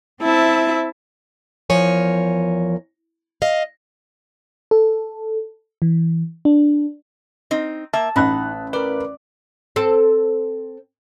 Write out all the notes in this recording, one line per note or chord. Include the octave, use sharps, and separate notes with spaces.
C4 E4 E5 A5
E2 F3 A#4 C#5 G#5
D#5 F5
A4
E3
D4
C4 D#4
A#3 E5 A5
A1 D#4 F#5 B5 F#6
A#4 B4 D5
C4 A4